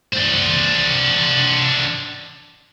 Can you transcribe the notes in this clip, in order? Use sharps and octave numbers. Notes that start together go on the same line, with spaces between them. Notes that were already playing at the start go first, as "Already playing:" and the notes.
D4 C5